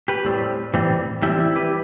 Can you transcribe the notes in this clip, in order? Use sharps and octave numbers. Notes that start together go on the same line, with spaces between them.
G4 B4
A2 G3 C4
A2 E3 G3 C4
A2 E3 G3 C4 E4 G4
E4
G4 B4